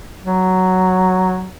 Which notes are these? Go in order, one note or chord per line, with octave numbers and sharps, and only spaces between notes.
F#3